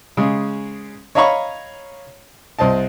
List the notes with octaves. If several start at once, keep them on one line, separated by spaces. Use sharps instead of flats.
C#3 G#3
C#5 D#5 F5 A#5 B5 C#6
C2 C5 D#5 A5